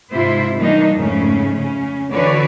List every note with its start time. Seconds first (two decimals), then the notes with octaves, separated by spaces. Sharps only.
0.12 G#2 C3 E4 F4 C5
0.57 D#3 E3 G3 A#3 D4 D#4
0.94 F2 G#2 C#3 A3 C#4
1.55 C#3 C#4
2.11 D3 E3 F#4 B4 C#5 D5